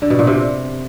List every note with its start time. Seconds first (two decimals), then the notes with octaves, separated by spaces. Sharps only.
0.02 D3
0.10 B2
0.19 A#2
0.27 C3